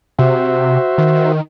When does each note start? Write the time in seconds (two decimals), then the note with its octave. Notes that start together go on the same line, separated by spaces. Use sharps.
0.19 C3 F#4 C5 E5
0.98 D#3